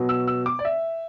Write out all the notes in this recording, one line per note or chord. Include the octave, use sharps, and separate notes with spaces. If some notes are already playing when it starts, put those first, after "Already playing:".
Already playing: B2 F#3 B3
E6
E6
D6
D5
E5